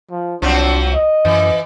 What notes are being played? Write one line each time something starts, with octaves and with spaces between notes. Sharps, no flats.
F3
C2 F3 F#3 C4 D4
D#5
F#2 E3